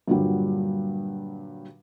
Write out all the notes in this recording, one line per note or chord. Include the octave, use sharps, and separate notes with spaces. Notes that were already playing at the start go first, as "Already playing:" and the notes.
G2 A#2 D3 F#3 G3